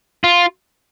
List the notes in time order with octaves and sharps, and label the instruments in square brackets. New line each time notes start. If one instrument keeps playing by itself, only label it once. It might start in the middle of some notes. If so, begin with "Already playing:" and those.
[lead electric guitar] F4